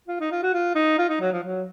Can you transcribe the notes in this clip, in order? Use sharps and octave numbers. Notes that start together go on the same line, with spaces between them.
F4
D#4
F4
F#4
F4
D#4
F4
D#4
F#3
F3
F#3